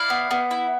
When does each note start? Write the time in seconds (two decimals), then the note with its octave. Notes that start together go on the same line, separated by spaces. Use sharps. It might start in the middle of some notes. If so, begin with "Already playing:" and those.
Already playing: E4 D5 F5
0.10 B3
0.31 B3
0.51 E4